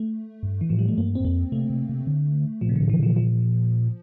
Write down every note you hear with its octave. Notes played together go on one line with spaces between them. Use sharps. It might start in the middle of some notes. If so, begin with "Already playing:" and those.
Already playing: A3
G2
E3
A2 F3
G3
A3
G2 A#3
C4
G2
F2 A#3
C3 A3
C3
C3
D3
A#2 F3
C3
A2 D3
E3
A#2 F3
F3